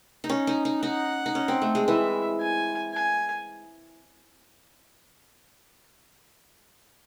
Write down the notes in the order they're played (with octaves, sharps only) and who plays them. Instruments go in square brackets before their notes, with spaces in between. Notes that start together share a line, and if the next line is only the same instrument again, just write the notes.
[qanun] D#4
C#4
D#4
D#4
[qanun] D#4 [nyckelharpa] F#5
[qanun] D#4
C#4
C4
A3
G#3
[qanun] E3 [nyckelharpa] E5
[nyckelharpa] G#5
G#5